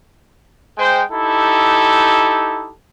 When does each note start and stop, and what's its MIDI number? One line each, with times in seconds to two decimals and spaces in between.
0.78 1.03 56
0.78 1.03 72
0.78 1.03 79
1.11 2.70 63
1.11 2.70 64
1.11 2.70 67
1.11 2.70 69